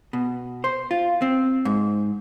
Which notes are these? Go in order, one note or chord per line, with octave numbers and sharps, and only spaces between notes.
B2
C5
F4
C4
G#2